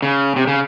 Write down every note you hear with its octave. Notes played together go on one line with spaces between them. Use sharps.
C#3
C3
C#3